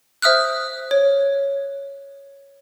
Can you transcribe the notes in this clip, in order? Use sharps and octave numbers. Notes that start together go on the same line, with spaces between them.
C5 E5 D#6 F6 F#6
C#5